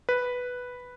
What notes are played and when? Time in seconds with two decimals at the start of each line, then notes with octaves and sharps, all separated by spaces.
0.09 B4